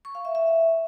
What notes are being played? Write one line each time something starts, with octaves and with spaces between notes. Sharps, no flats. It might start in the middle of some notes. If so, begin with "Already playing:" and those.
C#6
F5
E5
E5